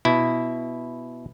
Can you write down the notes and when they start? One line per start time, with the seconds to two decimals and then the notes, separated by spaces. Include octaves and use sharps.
0.05 B2 E4